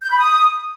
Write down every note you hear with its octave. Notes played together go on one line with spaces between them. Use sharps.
G6
B5
D#6